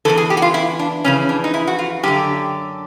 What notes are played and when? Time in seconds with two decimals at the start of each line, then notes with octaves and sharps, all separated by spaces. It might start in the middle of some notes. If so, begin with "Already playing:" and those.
0.05 E2 C#3 E3 A4
0.17 G#4
0.30 G4
0.37 F#4
0.42 F4
0.54 E4
0.79 D4
1.04 F2 C#3 E3 C#4
1.29 D4
1.44 D#4
1.54 E4
1.67 F#4
1.79 F4
2.03 F#2 D3 G4